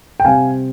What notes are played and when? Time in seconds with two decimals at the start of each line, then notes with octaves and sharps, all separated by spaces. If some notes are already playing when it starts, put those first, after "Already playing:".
0.20 G5
0.25 C3 G3 C4 F5 G#5